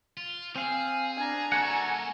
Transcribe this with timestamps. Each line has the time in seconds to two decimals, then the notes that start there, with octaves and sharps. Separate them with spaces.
0.17 F4
0.56 C4 G#4 F5 G#5
1.17 D4 G#5 A#5
1.52 A#3 F#4 A4 E5 F#5